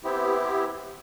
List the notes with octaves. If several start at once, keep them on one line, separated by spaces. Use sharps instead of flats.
B3 C4 E4 G4